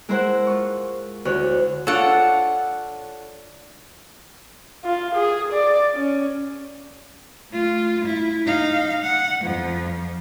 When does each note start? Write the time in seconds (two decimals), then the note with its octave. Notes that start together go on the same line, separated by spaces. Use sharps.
0.09 G#3 E4 A#4 C5 E5 F#5
0.47 F4 C#6
1.25 D2 E4 C#5 F#6
1.87 D4 F4 A4 C#5 F#5
4.84 F4
5.15 G#4
5.52 D5
5.94 C#4
7.51 A3 F4
8.05 E4
8.46 D#4 F5
9.03 F#5
9.42 F2 F3